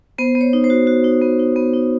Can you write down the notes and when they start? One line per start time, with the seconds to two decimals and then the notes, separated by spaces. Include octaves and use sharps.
0.18 B3 C5
0.35 B3
0.41 C#5
0.53 D#4
0.64 C5
0.70 F#4
0.87 F#4
1.04 D#4
1.21 B3
1.39 D#4
1.56 B3
1.74 D#4